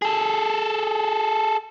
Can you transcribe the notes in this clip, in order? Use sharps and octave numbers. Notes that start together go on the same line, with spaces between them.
G#4 A4